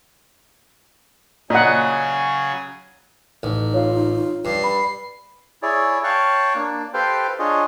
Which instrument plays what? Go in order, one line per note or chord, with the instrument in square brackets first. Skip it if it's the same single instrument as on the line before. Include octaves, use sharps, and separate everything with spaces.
[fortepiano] A#2 [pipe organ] C#3 F#3 G#4 [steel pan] D#5 F#5
[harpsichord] A1 [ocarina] D#4
[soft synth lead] F4 [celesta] C#5
[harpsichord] G2 [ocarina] D5 [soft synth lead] C7
[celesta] B5
[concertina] E4 G#4 C#5 D5
C#5 F5 G5 A5 C#6 F#6
A#3 D4
G4 A4 B4 C5 F5 G5
D4 F4 G#4 C#5 D#5